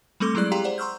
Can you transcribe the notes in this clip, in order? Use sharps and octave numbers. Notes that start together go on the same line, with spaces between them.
G3 A3 C4 A4 C6 D6
F#3 G#3 E4 G#4 D5 F#6
G4 G#4 F5 G5 A#5 C6
C5 D5 F#5
A#5 C6 C#6 E6 F6 G6